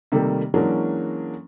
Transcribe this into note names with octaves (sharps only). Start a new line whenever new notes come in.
C3 D#3 G3 A3 A#3
E3 F#3 G#3 A#3 C#4 D4